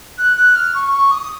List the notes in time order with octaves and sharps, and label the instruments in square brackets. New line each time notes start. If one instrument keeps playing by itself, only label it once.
[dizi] F#6
F#6
F6
C#6
C#6
D#6